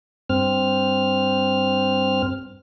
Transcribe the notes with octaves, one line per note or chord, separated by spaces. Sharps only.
G2 C4 F6